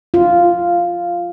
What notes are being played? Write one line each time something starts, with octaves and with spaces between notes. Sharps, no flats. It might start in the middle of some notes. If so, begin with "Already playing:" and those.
F4